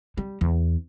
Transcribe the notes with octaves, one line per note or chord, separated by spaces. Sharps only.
G3
E2